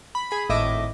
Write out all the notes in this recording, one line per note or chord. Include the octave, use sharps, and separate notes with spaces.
B5
G#4 B5
G#1 A2 D#5 E5 D6